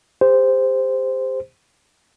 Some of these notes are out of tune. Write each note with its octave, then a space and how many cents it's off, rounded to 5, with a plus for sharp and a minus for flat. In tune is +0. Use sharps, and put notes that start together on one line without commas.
G4 +40 C5 -10